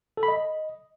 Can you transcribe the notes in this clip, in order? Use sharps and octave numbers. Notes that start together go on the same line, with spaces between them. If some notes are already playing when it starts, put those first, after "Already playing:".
A4
B5
D#5